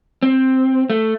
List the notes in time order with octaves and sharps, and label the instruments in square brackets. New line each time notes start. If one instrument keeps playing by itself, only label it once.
[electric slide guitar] C4
A3